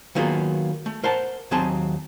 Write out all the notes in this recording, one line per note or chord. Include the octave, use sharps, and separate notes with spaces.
D#3 F#3 A#3 B3 F4 G#4
A3
A#4 C5 F#5 A5
D#2 F#3 C4 G#4 A5 C6